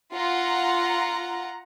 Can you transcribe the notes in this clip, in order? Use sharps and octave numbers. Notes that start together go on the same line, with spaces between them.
F4 F#5 A#5